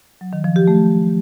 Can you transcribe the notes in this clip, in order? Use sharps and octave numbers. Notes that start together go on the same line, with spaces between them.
F#3
D#3
F3
G4
A3